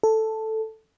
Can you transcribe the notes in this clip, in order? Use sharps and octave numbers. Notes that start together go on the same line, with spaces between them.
A4